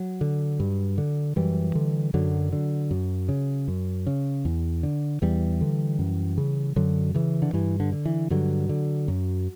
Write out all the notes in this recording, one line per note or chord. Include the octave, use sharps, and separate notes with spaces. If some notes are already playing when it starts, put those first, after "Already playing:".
Already playing: F#3
D3
G2
D3
F#2 E3 G3
D3
F#2 D3 F#3
D3
F#2
C#3
F#2
C#3
E2
D3
E2 E3 G3
D3
F#2
C#3
F#2 D3 F#3
C#3 E3
D3
G2 E3
D3
D3
E3
G2 D3 F#3
D3
F#2